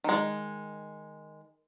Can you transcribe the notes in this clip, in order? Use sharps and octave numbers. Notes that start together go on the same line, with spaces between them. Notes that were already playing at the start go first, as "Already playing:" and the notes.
D#3 G#3